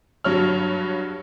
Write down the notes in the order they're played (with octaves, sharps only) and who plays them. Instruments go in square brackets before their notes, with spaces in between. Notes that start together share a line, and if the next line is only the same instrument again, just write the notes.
[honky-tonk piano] G2 F#3 C#5 F6